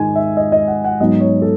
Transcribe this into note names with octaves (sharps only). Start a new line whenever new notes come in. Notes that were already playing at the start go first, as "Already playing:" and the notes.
Already playing: G#2 D#3 G#3 D#4 G#5
E5
D#5
D#5
F#5
F#5
G#2 F#3 B3 D#4 D#5
C#5
A4